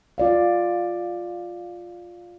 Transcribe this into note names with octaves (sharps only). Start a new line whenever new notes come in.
F4 D5 F5